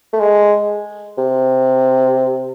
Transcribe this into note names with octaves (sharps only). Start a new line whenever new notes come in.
A3
G#3
C3